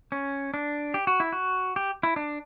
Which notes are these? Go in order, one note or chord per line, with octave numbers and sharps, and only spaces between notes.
C#4
D4
G4
F#4
E4
F#4
G4
E4
D4